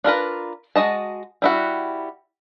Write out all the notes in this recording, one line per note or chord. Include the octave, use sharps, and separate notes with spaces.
D4 F4 A#4 B4
G#3 F#4 D#5 A5
G3 E4 F#4